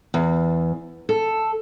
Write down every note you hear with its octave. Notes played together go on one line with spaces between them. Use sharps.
E2
A4